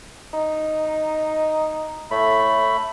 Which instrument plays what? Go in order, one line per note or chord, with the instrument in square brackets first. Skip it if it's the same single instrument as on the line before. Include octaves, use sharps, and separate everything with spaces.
[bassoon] D#4
[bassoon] A2 [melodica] A3 B5